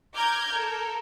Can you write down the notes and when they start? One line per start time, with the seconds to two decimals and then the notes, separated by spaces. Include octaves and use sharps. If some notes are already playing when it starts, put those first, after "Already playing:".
0.15 A#5 D6 F6 G6 G#6
0.54 A4 A#4